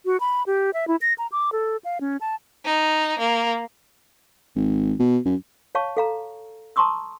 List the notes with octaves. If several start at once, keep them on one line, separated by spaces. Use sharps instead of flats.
F#4
B5
G4
E5
E4
A#6
A#5
D6
A4
F5
C#4
A5
D#4
A#3
G#1
B2
F#2
C#5 F5 A5 C#6
A4 F5 A#5
A5 A#5 C6 C#6 D#6 E6